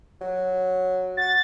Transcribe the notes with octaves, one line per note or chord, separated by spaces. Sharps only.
F#3
F#4 A6